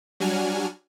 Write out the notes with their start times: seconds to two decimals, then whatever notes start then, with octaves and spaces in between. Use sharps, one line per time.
0.20 F#3 G3 D4 F#4 G#5 F6